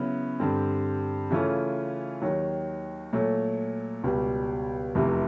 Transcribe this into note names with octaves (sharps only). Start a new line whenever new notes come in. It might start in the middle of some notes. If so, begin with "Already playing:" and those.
Already playing: C#3 F#3 B3 E4
G2 D3 G3 C4
C#3 E3 A3 C#4 F4
D#2 D#3 F#3
A#2 F#3 A3
C#2 B2 G3
F1 E2 C3 E3